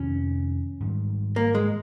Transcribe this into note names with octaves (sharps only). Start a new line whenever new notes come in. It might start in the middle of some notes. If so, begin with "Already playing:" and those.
Already playing: F2 C3 D#3 C#4
G#2 D#3 G3
A#3
G#3